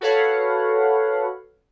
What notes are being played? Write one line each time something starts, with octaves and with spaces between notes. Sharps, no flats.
F#4 A4 B4 C#5 F5 F#5